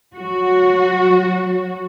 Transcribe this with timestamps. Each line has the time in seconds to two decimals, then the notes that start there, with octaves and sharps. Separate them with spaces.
0.15 F#3 F#4